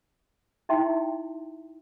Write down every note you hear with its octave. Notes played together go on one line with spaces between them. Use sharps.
D#4 E4 E5 G5 C6